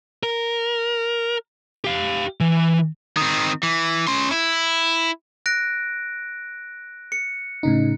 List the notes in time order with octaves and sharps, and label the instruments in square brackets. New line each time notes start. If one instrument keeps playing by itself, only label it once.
[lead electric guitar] A#4
G4 F5
E3
[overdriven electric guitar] D#3 C4
E3
C#4 C6
E4
[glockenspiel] F#6 A#6 D7
C#7
[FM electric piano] A2 C#3 D#4